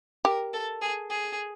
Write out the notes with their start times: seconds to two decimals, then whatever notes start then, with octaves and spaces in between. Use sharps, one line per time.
0.25 G4 A#4
0.53 A4
0.82 G#4
1.10 G#4